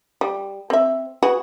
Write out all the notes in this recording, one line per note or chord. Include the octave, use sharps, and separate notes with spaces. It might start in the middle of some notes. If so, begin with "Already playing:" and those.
G3
C4 E5
F#4 G#4 B4